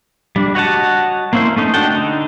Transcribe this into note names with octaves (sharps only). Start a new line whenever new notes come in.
G3 D4
F#4 C#5 D#5 F#5 A5
A#3 C4 C#4 E4 C5
A3 C#4 D#4
D4 F#4 A4 G5
D3 D#4